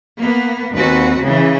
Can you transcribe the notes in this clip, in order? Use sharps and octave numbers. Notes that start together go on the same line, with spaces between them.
A#3 B3
D#2 C4 F#4 B4
C#3 E3 C#4